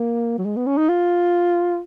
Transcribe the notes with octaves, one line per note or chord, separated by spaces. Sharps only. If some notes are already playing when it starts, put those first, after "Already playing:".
Already playing: A#3
F#3
G#3
B3
C#4
D#4
F4